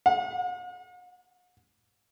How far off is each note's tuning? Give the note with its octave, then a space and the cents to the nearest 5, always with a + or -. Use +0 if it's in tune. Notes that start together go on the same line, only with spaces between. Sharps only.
F#5 -45